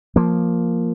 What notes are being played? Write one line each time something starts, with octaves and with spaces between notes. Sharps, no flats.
F3 A#3